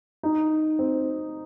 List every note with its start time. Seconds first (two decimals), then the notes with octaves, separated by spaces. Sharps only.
0.23 D#4
0.79 C4